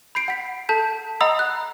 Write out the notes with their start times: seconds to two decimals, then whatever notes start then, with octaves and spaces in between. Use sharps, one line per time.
0.15 B5 G6 C7 D7
0.28 F#5 B6
0.69 A4 A5 G6 B6
1.21 D#5 F#5 A#5 B5 D#6 E6
1.39 F#6